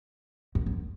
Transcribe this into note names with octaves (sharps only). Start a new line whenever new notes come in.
F#2
F#2